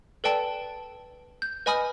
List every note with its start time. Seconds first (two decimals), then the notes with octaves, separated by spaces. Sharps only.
0.24 A4 B4 D5 G5 A5
1.42 G6
1.66 B4 D#5 G#5 B5 D#6 F6